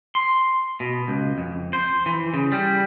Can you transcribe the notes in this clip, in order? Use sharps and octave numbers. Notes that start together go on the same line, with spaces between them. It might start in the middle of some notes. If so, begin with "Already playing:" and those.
C6
B2
C#2
F2
C5
E3
C#3
G3